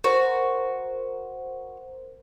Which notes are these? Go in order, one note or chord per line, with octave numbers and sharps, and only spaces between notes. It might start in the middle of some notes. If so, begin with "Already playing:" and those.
F#4 A#4 C5